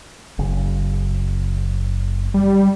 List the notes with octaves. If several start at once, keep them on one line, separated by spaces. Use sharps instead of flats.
F#1 C#3
G3